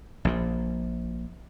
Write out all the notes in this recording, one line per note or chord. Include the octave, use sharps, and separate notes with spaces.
A#1 A#2